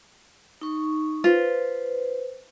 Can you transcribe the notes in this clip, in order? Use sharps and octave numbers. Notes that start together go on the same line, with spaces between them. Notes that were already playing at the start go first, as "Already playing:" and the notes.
D#4 C#6
F4 B4 C5